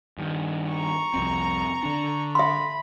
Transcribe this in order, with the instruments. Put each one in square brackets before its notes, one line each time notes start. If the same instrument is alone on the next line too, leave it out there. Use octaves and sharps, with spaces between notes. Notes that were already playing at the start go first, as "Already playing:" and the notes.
[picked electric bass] G2 D#3
[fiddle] A#5 C#6
[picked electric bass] C2 F2 C4
D3 D4
[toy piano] E5 C6 [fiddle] B5